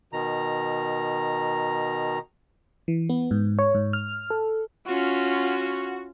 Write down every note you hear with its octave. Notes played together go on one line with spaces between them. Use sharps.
B2 D#3 A#5
E3
B3
G#2
C#5
G#2
F6
A4
C#4 F4 F#4